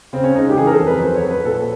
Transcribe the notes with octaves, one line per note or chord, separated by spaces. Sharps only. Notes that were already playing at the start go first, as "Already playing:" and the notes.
C#3 C4
C#4
G#3 D#4
G4
E3 G#4
A#4
A4
F2
B4
F#3 C5
C#5
F#3
B4
A#2 A4